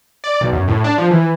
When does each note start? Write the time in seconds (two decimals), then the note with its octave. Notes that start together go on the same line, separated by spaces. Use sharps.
0.24 D5
0.41 B1
0.53 F#2
0.68 A2
0.84 D4
0.98 F3
1.11 E3